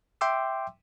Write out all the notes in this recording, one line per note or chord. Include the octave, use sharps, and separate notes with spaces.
E5 G5 C6 D6 E6